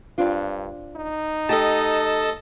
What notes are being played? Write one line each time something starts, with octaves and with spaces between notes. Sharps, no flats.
G2 C4 D4 F4
D#4
A3 G4 A4 D#5 A5